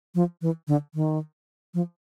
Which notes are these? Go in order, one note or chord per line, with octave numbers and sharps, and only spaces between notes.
F3
E3
D3
D#3
F3